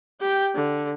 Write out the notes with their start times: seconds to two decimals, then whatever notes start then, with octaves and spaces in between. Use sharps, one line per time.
0.21 G4 G5
0.55 D3